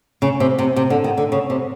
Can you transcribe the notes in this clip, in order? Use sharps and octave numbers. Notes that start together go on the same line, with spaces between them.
C#3
C3
C3
C3
D3
D#3
D3
C#3
C3